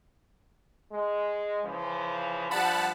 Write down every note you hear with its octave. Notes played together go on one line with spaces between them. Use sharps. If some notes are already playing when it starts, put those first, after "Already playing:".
G#3
C#3 E3 F3
G2 F3 G3 F#5 A5 B5